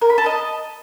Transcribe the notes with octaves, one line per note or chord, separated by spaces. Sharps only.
A#4
B5
A4
D#5